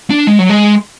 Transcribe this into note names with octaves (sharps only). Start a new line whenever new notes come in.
D4
G#3
F#3
G#3